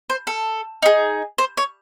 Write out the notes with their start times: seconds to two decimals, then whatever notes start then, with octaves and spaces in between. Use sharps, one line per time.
0.10 C5
0.27 A4
0.82 D#4 G#4
1.38 C5
1.57 C#5